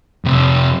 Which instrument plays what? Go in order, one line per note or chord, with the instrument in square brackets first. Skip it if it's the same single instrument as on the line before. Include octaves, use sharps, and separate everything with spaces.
[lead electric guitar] F2 C3